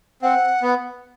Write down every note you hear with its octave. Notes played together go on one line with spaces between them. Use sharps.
C4 F#5
B3